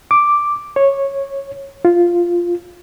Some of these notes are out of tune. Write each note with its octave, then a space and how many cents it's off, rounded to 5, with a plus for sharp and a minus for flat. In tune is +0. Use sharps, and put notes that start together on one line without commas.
D6 +0
C#5 -10
F4 -5